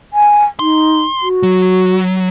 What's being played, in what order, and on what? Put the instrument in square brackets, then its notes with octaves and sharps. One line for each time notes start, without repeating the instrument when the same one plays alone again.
[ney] G#5
[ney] D#4 [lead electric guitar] C6
[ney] F#4
[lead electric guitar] F#3